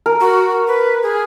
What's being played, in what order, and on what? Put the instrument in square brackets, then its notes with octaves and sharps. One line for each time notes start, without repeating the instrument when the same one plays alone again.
[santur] A#4
[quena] F#4
B4
G#4